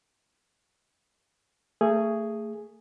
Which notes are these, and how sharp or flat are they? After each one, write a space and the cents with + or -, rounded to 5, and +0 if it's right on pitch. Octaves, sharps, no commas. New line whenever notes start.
A3 +30 G#4 +0